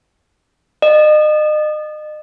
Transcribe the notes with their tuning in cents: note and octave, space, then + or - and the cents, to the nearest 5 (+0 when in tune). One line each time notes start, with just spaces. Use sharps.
D#5 -35